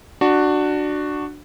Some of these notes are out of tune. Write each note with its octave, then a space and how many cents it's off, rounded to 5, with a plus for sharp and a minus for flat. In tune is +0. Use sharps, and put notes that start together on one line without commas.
D4 +15 F#4 +0